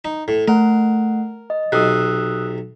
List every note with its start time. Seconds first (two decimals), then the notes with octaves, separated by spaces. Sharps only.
0.05 D#4
0.28 A2
0.48 A3 A#4 F#5
1.50 D#5
1.72 B1 C3 D#6 E6 F#6